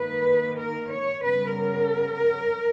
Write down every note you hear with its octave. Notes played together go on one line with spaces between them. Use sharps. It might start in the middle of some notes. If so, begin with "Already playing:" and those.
Already playing: D#3 A#3 B4
A#4
C#5
C#3 G3 B3 B4
A#4